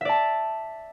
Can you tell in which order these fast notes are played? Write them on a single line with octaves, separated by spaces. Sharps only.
E5 D5 A5